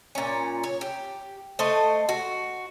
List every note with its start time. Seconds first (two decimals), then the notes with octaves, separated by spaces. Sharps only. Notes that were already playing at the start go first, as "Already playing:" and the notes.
0.15 A#2 C#4
0.64 C#5
0.81 G4
1.59 A3 C5 D#5
2.09 F#4